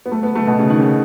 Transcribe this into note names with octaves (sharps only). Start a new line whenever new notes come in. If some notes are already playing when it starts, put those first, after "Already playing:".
B3
A3
B3
A3
B2
C#3
D#3
C#3